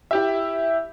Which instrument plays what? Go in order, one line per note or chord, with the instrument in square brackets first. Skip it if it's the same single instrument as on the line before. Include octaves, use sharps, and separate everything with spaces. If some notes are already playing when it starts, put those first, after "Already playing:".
[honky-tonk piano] E4 G4 E5